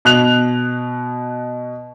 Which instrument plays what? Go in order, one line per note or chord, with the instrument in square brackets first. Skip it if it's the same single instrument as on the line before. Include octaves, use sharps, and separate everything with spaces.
[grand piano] B2 F#6 F7